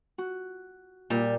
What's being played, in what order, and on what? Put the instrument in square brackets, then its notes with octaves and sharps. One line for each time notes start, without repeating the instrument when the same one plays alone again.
[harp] F#4
[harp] A#2 [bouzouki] G3